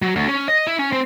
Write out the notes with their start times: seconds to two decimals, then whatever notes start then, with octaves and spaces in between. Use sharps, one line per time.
0.02 F#3
0.16 D2
0.28 C#4
0.48 D#5
0.67 E4
0.79 C#4
0.92 C4